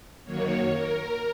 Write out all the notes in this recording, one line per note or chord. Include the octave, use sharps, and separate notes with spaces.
F#2 D#3 F#3 A#3 C#5
A#4